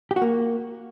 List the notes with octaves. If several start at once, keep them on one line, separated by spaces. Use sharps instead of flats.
G4
F#4
A#3